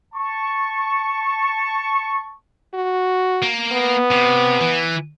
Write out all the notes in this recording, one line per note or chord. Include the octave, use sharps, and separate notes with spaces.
A5 C#6
F#4
A#3
B3
C3
E3